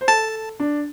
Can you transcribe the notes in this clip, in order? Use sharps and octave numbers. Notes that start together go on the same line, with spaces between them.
C5
A4 A5
D4